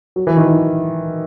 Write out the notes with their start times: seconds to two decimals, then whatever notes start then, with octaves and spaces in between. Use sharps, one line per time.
0.16 F#3
0.27 E3
0.37 D#3
0.47 E3